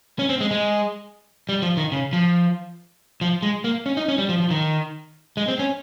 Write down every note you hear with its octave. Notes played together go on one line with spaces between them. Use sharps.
C#4
C4
G#3
G#3
G3
F3
D#3
C#3
F3
F3
G#3
A#3
C#4
D#4
C#4
G3
F3
F3
D#3
G#3
C4
C#4